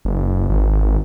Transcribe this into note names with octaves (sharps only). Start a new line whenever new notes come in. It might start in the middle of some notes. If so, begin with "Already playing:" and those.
F#1
G#1